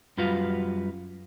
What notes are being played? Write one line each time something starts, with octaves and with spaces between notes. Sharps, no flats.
F#2 G3 F4 F#4 B4 F5